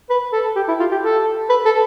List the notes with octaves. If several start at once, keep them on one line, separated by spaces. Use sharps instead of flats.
B4
A4
G4
E4
F4
G4
A4
B4
A4